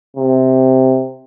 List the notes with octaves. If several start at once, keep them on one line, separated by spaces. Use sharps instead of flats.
C3